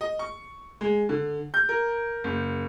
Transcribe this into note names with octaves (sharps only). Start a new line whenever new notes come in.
D#5
C#6
G#3
D3
G6
A#4
F#1